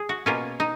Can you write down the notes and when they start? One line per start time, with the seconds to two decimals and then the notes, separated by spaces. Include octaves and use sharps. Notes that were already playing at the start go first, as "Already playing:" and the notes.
Already playing: G#4
0.09 F#4
0.26 B2 A#3 C#4 F4
0.60 D#4